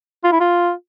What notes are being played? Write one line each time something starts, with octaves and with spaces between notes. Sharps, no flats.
F4
E4
F4